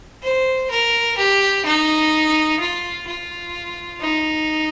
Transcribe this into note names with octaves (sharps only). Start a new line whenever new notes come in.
C5
A#4
G4
D#4
F4
F4
D#4